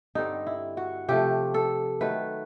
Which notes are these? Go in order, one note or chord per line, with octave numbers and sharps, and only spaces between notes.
G2 D3 G3 C4 D#4
E4
F#4
C3 F3 A3 G4
A4
D#3 F#3 A3 B4